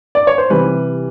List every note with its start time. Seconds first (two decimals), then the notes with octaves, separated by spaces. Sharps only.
0.15 D5
0.27 C#5
0.38 C5
0.50 C3 E3 G3 B4